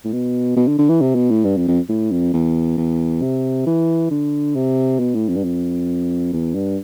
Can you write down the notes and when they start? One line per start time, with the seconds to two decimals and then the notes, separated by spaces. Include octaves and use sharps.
0.05 A2
0.12 B2
0.56 B2
0.68 D3
0.79 D3
0.89 E3
1.01 C3
1.15 B2
1.30 A2
1.44 G2
1.57 F2
1.68 F2
1.89 A2
2.11 F2
2.34 E2
2.77 E2
3.22 C3
3.66 E3
4.10 D3
4.55 C3
4.99 B2
5.14 A2
5.28 F2
5.36 G2
5.44 F2
6.33 E2
6.54 G2